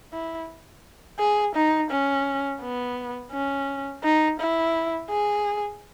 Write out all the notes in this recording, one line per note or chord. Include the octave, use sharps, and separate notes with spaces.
E4
G#4
D#4
C#4
B3
C#4
D#4
E4
G#4